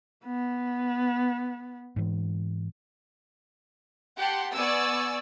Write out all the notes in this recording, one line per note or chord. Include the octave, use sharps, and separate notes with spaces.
B3
G#2 E3
G4 F#5 A5 C6
B3 D5 G#5 C#6 E6